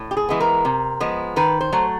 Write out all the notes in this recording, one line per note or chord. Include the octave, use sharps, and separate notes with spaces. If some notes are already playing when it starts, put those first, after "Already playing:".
Already playing: A2
G4
G#4
E3 G#3 B3
A#4
C3
F3 G#3 B3
D#3 B4
C5
F#3 A3